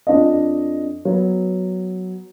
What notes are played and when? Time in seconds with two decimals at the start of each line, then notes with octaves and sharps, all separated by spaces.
0.07 F2 D4 D#5
1.05 F#3 B3